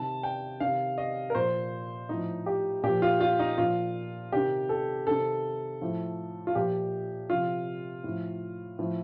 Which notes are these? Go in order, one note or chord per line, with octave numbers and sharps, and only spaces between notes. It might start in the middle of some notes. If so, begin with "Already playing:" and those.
Already playing: C3 D#3 A5
G5
C3 D#3 F5
D#5
A#4
A#2 F3 C5
A2 F3 D#4
G4
A#2 F3 G4
F4
F4
D#4
A#2 F3 F4
C3 D#3 G4
A4
C3 D#3 A4
A2 F3
F4
A#2 F3 G4
C3 F3 F4
A2 F3
A2 F3